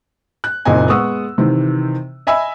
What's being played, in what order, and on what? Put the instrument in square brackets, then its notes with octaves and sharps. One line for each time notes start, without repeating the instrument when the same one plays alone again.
[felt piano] F#6
F#1 A#2 C4 D#4 D#5 G#5
G#3 B3 F#5 C#6 D#6 E6
C3 D#3 E3
D#5 E5 G#5 B5 E6